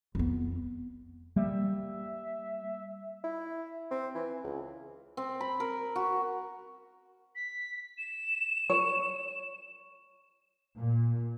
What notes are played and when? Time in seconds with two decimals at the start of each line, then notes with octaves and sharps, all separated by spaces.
0.15 F2 B3
1.36 G3 A#3 E5
3.24 E4
3.91 C4
4.14 E3
4.44 C#2
5.17 C4
5.41 B5
5.60 A#4
5.96 F#4
7.35 B6
7.98 E7
8.70 C#5
10.78 A#2